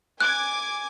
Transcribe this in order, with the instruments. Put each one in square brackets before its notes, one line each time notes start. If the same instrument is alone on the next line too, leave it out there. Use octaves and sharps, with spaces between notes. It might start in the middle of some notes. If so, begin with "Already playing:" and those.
[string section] G#5 D6 G#6 [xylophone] F#6